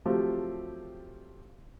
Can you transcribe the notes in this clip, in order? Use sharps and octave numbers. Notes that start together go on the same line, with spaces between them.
F3 F#3 A3 C4 G4